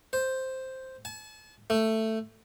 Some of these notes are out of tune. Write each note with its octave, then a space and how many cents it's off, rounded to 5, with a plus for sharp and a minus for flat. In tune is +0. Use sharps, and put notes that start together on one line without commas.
C5 +0
A5 -40
A3 +10